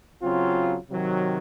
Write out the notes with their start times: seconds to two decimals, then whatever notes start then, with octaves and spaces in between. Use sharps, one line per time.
0.21 C#3 F#3 C4 F4
0.89 C3 D#3 F#3